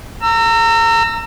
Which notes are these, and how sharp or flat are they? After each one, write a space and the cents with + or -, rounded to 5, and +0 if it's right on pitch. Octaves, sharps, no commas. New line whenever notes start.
A#5 -25 E6 +25